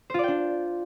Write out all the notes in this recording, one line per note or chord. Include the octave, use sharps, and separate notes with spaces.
D4 F4 C5 D5 G5